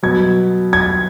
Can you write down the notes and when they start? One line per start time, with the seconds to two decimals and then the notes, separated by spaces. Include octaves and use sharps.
0.03 B2 F#3 G#6
0.73 G#6